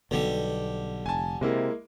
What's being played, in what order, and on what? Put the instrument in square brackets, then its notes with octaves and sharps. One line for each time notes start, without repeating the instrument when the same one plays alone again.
[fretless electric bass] B1 B2 [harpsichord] D3 G3
[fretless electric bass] F1 [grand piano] G#5 A5
[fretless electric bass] C3 [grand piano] G#3 A#3 E4